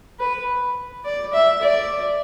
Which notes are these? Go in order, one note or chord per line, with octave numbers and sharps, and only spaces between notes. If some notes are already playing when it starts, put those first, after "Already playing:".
B4
D5
E5
D5